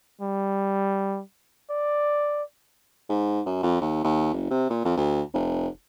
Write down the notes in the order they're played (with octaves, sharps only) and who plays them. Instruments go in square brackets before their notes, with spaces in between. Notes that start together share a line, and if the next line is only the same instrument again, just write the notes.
[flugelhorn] G3
D5
[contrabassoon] G#2
F#2
F2
D#2
D#2
F#1
C3
A#2
F2
D2
F1